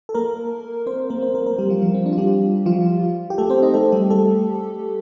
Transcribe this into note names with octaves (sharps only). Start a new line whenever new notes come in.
A4
A#3 A#4
C4 C5
A#3 A#4
C4 C5
A#3 A#4
A#3 A#4
G3 G4
F3 F4
F3 F4
C4
D4
F4
G3 G4
F3 F4
G4
A3 A4
C4 C5
D#4 D#5
A3 A4
G3 G4
A3 A4